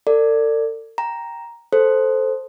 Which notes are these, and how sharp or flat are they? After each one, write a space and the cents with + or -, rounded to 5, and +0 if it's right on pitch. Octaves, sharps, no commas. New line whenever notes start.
A4 +45 D5 +0
G5 +0 A#5 +5
A4 +0 C5 +0